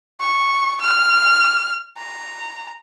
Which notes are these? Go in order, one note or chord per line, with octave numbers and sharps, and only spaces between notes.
C#6
F6
A#5